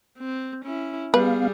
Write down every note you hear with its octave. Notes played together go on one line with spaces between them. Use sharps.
C4
C#4 E4
G3 B3 G#4 B4 F5